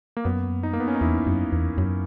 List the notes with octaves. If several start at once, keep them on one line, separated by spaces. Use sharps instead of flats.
A#3
F#2 B3
D#4
A#3
B3
C#4
D#4
E2 E4
F#2
E2
F#2